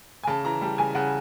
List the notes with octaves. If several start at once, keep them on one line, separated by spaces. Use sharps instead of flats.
G#5
C#3 A5
E3 A#5
G3 A5
C#3 G#5
C#3 F#5